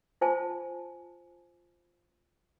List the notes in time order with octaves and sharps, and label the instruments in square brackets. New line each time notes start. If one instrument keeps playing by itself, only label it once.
[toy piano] F4 C5 G#5 A5